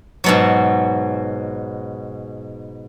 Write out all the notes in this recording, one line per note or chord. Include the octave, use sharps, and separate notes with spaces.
G#2 B2 F#3